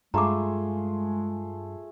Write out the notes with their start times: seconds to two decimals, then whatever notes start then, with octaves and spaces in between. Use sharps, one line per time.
0.14 G2 G#3 A3 F4 G#4 A#5 D6